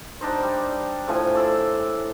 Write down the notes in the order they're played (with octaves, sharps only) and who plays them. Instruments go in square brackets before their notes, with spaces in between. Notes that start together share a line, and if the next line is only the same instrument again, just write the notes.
[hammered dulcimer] G3 D4 D#4 C5
G3
A2 F3 G#5
D5 E5 C6